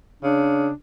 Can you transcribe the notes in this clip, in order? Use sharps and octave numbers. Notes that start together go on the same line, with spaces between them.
C#3 D4